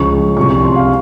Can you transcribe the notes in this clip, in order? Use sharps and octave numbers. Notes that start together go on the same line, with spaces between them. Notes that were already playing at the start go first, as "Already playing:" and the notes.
Already playing: C#2 C#3 F3 C#6
C2 C3 F3 C#6
C#6
C6
F5